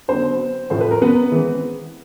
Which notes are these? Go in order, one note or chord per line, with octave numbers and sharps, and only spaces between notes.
D3 F#3 B3 C4 C5
A2 F3 A3 C5
B4
A#4
B3 B4
E3 G#3 C4